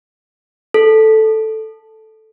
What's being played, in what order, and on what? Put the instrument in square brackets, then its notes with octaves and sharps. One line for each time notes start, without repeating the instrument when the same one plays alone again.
[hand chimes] A4